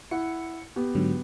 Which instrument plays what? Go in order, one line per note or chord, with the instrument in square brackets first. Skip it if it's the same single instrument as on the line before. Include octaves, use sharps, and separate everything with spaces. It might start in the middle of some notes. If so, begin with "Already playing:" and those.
[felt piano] E4 F#5 [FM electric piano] C#7
[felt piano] B3 G4
[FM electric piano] G#2 D3 F#3